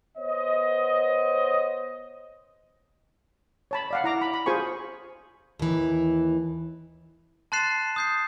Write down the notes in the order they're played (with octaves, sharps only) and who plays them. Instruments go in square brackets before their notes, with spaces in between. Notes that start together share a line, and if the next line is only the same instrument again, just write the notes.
[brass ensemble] B3 C5 C#5 D#5
[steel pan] C#5 A5 B5
D5 F5 F#5
E4 A#5 D6
B5
B5
F4 G#4 C5 G#5 C#6
[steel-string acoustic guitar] D#2 E3
[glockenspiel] A5 C6 F#6 A6 C7 E7
D#6 G6 C7